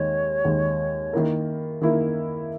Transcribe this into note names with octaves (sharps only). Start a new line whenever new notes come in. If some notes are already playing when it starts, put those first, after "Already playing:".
Already playing: D#2 D#3 G#3 C#5
D#2 D#3 G#3
D#3 A#3 E4 A#4
D#3 A#3 E4 A#4